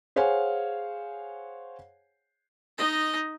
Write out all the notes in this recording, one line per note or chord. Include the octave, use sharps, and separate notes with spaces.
G#4 C5 C#5 F5 F#5 G#5
D#4 D#5